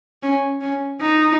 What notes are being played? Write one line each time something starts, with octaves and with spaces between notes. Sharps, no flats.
C#4
C#4
D#4